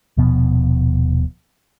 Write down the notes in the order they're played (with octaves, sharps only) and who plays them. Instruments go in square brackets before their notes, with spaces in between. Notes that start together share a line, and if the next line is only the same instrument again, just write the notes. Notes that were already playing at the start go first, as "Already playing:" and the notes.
[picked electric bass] D#1 B2 F3 B3